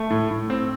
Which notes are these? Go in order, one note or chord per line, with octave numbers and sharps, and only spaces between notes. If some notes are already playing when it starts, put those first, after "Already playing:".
Already playing: A3
A2
A2
C4